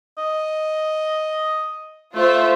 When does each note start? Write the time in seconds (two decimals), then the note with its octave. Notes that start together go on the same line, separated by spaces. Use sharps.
0.18 D#5
2.15 A3 F4 C5 E5